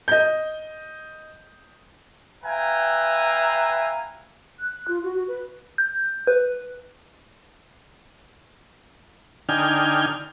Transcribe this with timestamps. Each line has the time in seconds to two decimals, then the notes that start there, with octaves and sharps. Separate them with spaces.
0.08 D#5 G6
2.44 B4 E5 F5 G5 G#5 A#5
4.60 F#6
4.88 F4
5.04 F#4
5.15 F#4
5.28 B4
5.78 G6
6.27 B4
9.49 D3 D#4 G5 G#5 F6